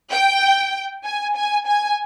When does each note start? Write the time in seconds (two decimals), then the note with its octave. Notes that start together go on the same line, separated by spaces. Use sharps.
0.11 G5
1.04 G#5
1.36 G#5
1.66 G#5